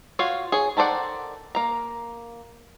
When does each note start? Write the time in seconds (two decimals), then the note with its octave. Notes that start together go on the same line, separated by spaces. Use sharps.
0.19 F4 F#4 C#5 F5
0.52 G#4 C#5
0.77 D#3 A4 C5 D5 F#5
1.55 A#3 A#5